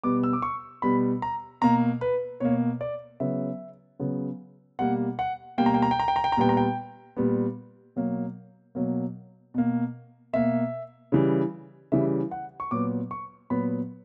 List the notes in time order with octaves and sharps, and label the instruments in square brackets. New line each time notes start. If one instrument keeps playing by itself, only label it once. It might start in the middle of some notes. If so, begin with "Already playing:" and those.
[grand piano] B2 G3 B3 D6
E6
D6
C#6
B2 G3 B3 B5
A#5
B2 A#3 A#5
B4
B2 A#3 C#5
D5
C#3 F#3 B3 E5
C#3 F#3 B3
B2 G3 A#3 F#5
F#5
B2 G3 A#3 G5
A#5
G5
A#5
G5
A#5
G5
A#5
G5
A#5
A#2 G3 B3 G5
A#5
G5
A#2 G3 B3
B2 F#3 A#3
B2 F#3 A#3
B2 A#3
B2 A#3 E5
C#3 E3 G3
C#3 E3 G3 E5
F#5
C#6
A#2 F#3 B3 D6
C#6
A#2 F#3 B3 B5